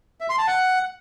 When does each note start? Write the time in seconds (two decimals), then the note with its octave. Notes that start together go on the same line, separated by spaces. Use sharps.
0.21 E5
0.29 C6
0.38 A5
0.47 F#5